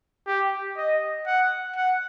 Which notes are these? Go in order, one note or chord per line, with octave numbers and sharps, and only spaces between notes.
G4
D#5
F#5
F#5